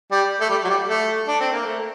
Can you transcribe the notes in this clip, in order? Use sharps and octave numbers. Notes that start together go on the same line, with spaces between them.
G3
A3
G3
F#3
G3
A3
D4
C4
A#3
A3